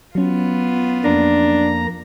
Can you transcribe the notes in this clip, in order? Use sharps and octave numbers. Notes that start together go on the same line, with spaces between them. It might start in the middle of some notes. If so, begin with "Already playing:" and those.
F#3 B3 C#4 F4
F2 A#3 D4 A#5